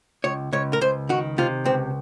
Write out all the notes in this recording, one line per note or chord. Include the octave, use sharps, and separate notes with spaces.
C#2 C#5
C#2 C#5
A#4
C#2 C5
D#3 F#4
C3 F4
C#2 C4